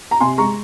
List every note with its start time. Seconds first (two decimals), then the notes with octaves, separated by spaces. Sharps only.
0.11 A#5
0.20 C3 G#5 C6
0.38 G#3 A#5 C#6